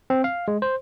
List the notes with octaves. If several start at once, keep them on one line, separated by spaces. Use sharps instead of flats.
C4
F5
G#3
C5